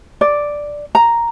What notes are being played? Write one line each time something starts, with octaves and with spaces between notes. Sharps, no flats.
D5
A#5